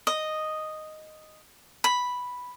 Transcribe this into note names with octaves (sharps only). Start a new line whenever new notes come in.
D#5
B5